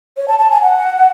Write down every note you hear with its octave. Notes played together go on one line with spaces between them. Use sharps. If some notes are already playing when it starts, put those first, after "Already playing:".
C#5
A5
A5
G#5
F#5